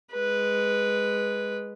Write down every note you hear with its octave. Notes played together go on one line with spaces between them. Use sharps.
G#3 B4